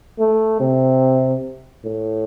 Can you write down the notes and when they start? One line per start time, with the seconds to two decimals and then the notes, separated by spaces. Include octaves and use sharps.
0.19 A3
0.60 C3
1.84 A2